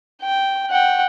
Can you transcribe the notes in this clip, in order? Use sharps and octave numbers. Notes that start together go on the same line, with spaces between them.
G5
F#5 G5